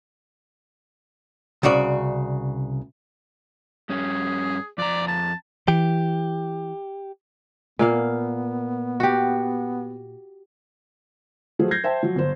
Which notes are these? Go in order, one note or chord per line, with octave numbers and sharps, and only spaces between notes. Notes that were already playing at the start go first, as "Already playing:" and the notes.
C2 C#3 F#4 D5
G2 C#4 G#4
F2 D5 A#5
A5
E3 G4
A#2 A#3 B3 F5
F#4 G4
F3 F#3 A3 F4 G#4 C5
G6 G#6 A#6 C7
C5 E5 G5 A5
F3 F#3
G1 C5